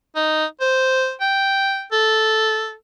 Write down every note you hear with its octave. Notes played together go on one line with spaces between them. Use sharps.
D#4
C5
G5
A4